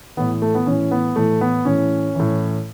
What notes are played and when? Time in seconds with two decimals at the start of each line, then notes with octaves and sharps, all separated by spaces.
0.17 A2 E3 B3
0.42 A3
0.55 B3
0.66 A2 E3 C#4
0.91 B3
1.16 A2 E3 A3
1.41 B3
1.65 A2 E3 C#4
2.15 A2 E3